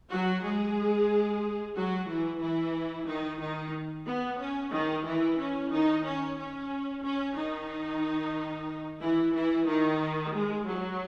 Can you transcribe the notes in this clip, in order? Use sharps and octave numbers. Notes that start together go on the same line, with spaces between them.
F#3 F#4
G#3 G#4
F#3 F#4
E3 E4
E3 E4
D#3 D#4
D#3 D#4
B3
C#4
D#3 D#4
E3 E4
C#4
D#3 D#4
C#4
C#4
C#4
D#3 D#4
E3 E4
E3 E4
D#3 D#4
G#3
F#3